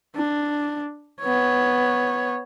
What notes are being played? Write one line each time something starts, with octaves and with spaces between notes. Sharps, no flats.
D4
B3 C#5